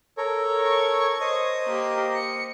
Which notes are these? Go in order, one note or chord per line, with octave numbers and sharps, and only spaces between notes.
A4 A#4 C#5
C#6 G#6
C5 D#5 D#6
A#3 G4
C#7